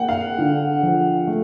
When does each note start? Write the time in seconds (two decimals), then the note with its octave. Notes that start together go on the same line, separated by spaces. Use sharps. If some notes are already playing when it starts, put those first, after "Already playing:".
Already playing: A#3 F#5 G5
0.09 F5
0.38 D3
0.83 F3
1.27 A3